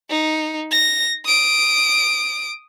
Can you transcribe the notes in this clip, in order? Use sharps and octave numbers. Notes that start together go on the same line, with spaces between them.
D#4
A#6
D#6 D7